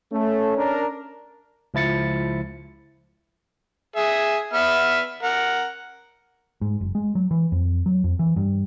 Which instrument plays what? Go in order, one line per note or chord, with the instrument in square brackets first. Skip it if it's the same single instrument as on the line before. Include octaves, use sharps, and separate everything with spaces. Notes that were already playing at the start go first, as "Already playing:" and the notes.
[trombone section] A3 [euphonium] C#4
[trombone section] D4 A#4
[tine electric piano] C#2 F3 E4 A6 C#7
[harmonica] G#4 E5
B3 E5 F6
A#4 F#5
[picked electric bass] G#2
F#1
G#3
F#3
E3
F2
F#3
F2
E3
G2